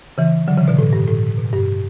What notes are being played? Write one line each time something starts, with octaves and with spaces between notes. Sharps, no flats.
C#3 E3
D3 F#3
C#3 E3
B2 D3
A2
G2
A2
B2
G2